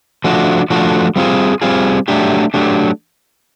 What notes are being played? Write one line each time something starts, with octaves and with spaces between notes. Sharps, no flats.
F3 A3 D4 F#4
F3 A3 D4 F#4
G3 C4 F4 G#4
G3 C4 F4 G#4
F#3 A3 D4 G4
F#3 A3 D4 G4